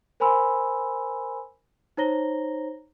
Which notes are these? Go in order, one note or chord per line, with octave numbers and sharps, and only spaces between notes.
A#4 C5 G#5 B5 C6 E6
D#4 C5 C#5 A#5 A#6 G7